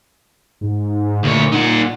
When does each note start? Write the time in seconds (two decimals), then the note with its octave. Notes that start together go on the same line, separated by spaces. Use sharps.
0.61 G#2
1.24 D2 A#2 C#5
1.52 D#4 F#5